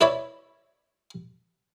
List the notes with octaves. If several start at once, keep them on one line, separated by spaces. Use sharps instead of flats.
E4 B4 C#5 D5 E5 B5